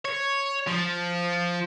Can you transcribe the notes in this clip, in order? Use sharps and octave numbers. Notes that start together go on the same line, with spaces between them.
C#5
F3